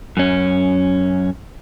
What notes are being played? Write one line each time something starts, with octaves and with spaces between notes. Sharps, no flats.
F#2 C#4